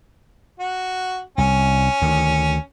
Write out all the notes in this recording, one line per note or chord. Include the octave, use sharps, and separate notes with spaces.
F#4
C2 C#4
D2 D#3